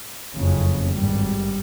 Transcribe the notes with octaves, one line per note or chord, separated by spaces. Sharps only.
F#1 F2 C#3
G#1 G2 G3